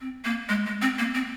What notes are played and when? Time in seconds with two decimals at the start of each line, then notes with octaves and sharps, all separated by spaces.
0.01 C4
0.25 A#3
0.49 G#3
0.66 G#3
0.82 C4
0.98 A#3
1.15 C4